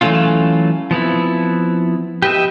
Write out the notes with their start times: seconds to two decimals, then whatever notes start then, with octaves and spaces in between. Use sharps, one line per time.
0.01 E3 F#3 A3 C#4 F4
0.91 F3 B3 C4 E4
2.22 G4 B4 D#5 E5